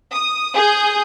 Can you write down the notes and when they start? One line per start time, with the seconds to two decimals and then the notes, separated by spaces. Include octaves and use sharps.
0.12 D#6
0.56 G#4 D#6 G6